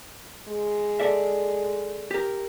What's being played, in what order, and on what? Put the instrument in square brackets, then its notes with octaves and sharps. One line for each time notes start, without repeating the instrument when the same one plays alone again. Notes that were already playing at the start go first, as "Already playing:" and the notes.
[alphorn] G#3
[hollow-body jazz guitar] A4 D5 E5
G4 A#4